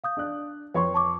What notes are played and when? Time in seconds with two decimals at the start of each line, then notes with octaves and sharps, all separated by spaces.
0.04 F5 D#6 G6
0.17 D4 D5 F#6
0.74 F2 B4 C#5 C6 C#6
0.94 A5 C#6 D6